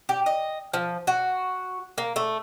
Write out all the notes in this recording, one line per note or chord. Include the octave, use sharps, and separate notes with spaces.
G4
D#5
F3
F#4
A#3
A3